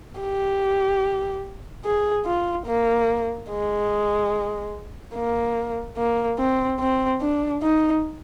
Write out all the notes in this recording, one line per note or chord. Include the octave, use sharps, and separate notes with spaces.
G4
G#4
F4
A#3
G#3
A#3
A#3
C4
C4
D4
D#4